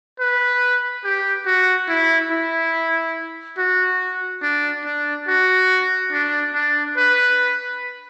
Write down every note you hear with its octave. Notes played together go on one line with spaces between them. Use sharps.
B4
G4
F#4
E4
E4
F#4
D4
D4
F#4
D4
D4
B4